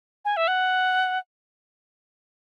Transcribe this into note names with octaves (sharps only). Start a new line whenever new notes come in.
G#5
E5
F#5